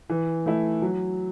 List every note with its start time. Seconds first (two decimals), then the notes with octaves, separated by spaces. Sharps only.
0.10 E3
0.46 A3 E4
0.82 F#3